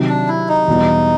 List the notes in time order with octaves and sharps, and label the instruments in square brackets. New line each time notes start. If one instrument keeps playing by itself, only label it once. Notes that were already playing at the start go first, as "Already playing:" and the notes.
Already playing: [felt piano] C3 D#3 F#3
[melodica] D4
E4
D#4
[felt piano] E2 B2 G3 B3 E4